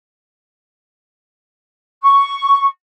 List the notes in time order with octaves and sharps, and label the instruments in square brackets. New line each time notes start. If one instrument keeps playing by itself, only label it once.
[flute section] C#6